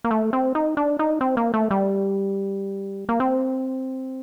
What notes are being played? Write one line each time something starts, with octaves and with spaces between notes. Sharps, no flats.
A#3
A3
C4
D#4
D4
D#4
C4
A#3
A3
G3
A#3
C4